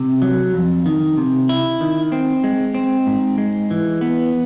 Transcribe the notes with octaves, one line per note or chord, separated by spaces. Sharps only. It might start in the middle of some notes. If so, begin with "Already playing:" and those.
Already playing: C3
F#3
F2
D#3
C3
E4
D#3
C4
G#3
C4
G#2
G#3
E3
B3